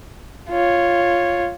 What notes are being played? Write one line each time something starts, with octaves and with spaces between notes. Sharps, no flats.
F4 C#5